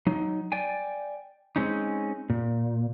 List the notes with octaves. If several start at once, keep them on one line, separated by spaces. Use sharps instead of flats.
F#3 D#4
D5 G5 G#5
G#3 C4 C#4 D#4
A#2